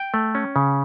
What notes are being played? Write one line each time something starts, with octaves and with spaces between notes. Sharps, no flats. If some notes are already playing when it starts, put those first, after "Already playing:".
Already playing: G5
A3
C#4
C#3